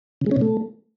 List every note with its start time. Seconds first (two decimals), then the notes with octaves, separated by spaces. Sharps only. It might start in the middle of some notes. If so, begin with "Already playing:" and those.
0.21 C#3
0.26 G#3
0.31 C#4
0.36 B2
0.41 A3